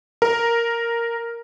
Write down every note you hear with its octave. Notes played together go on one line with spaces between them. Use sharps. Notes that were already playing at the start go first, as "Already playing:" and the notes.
A#4